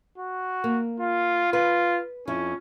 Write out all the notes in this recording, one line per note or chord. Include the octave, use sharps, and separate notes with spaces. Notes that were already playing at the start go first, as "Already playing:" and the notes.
F#4
A#3
F4
F4 B4
F2 C#4 E4